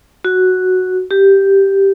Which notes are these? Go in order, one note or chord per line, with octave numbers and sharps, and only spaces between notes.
F#4
G4